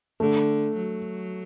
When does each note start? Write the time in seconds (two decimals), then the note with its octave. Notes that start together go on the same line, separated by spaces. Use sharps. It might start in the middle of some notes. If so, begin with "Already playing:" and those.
0.20 D3 A3
0.76 F#3